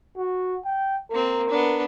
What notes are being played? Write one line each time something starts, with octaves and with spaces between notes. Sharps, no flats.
F#4
G5
A#3 C4 A#4
B3 D4